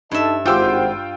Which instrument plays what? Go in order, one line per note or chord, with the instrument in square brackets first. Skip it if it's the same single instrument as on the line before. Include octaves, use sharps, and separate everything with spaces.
[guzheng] G2 E5 [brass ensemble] D#4 D#5 A5
[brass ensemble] G#1 F#5 [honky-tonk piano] F4 G5 E6 [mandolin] G4 C5 G6